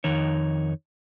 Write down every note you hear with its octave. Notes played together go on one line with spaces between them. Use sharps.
F2 D#3 D#4 C#5